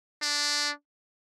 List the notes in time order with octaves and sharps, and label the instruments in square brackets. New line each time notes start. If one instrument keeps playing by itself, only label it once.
[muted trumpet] D4